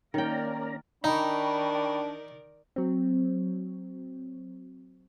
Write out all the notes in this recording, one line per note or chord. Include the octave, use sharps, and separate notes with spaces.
D#3 A#3 C#4 A#4 D5 G5 A#5
D#3 D4 D#4 A#4 D5 G5 B5 C#6
F#3 C4